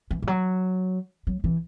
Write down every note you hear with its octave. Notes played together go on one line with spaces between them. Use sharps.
E3
E3
F#3
F#3
E3